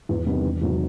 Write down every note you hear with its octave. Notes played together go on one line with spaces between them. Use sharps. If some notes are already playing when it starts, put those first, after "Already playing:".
E2
C3 D#3 G3 B3
E1
E2 C3 D#3 F#3